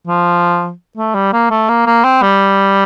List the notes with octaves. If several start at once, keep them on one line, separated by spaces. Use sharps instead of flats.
F3
A3
G3
A#3
A3
A#3
A#3
C4
G3